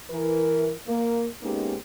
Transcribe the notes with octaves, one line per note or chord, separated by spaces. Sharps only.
E3 A#4
A#3
G#3 A#3 B3 C#4 D#4 G4